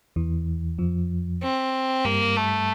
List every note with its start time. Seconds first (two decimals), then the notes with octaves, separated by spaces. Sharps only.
0.16 E2 E3
0.78 F2 F3
1.43 C4
2.05 G2 G3 A#3
2.36 A3